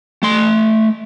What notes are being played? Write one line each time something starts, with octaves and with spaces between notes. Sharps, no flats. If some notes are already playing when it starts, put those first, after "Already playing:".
A3 C6